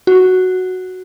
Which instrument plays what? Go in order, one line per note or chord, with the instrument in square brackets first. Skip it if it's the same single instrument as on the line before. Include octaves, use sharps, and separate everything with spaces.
[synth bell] F#4